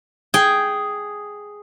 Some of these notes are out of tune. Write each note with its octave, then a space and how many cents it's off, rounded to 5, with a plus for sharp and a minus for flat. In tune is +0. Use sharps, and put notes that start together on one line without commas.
G#4 +0 G5 +0